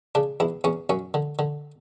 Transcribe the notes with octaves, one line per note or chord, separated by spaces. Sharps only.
C#3 D4
E2 E4
E2 C#4
F#2 C#4
D3
D3